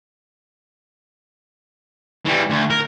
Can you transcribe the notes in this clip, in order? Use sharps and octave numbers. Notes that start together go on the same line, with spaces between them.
E3 G3
D2
A#4